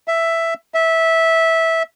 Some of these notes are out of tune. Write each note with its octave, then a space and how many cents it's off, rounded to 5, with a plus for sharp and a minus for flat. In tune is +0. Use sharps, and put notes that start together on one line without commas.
E5 +5
E5 -15